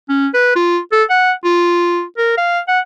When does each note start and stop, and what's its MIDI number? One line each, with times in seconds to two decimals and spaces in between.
0.09 0.27 61
0.34 0.52 71
0.56 0.79 65
0.92 1.03 69
1.10 1.32 78
1.45 2.03 65
2.18 2.35 70
2.38 2.59 77
2.68 2.79 78